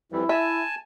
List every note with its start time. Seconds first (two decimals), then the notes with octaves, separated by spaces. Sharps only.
0.12 F2 E3 G3 E4
0.29 E5 G#5 A5